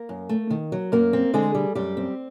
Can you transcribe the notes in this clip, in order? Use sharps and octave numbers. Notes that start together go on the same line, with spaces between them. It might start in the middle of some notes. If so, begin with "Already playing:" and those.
Already playing: A#3 A#4
F#2
A3
D#3
F#3
F#2 A#3 A#4
C4
D3 G#3 G#4
G3
F#2 G3 G4
C4